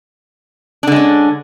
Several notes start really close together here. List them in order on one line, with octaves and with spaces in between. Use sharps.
D4 D3 G#3 C#4